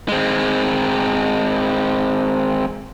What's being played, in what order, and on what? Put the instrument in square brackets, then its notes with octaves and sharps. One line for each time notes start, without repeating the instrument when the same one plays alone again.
[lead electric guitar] G#3 C4